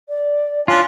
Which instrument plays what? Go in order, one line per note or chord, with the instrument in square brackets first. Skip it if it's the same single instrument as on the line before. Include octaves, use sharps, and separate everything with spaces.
[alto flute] D5
[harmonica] C#4 D4 [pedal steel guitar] F4